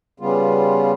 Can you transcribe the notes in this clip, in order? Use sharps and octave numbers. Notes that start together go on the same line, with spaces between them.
C#3 G3 B3 F4